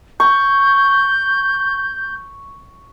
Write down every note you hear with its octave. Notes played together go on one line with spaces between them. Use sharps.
C#6 G6